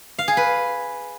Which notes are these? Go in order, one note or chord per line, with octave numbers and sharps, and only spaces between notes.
F5
G#4
B4